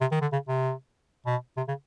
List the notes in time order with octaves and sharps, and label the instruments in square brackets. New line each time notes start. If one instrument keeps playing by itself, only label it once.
[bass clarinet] C3
D#3
D3
C#3
C3
B2
C3
C#3